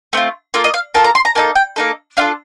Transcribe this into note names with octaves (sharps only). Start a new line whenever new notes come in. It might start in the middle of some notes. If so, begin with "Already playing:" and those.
A3 C4 F4
A#3 F4 A4
D#5
F5
A#3 F4 A4 A5
A#5
C6
A#5
A#3 D#4 A4 A5
G5
A#3 D#4 A4
D4 F4 A4 F5